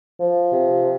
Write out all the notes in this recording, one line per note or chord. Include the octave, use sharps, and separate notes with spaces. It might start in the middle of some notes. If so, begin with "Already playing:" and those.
F3
C3